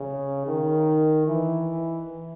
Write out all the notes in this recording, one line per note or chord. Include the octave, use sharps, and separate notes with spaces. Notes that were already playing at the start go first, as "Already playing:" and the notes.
Already playing: C#3
D#3
E3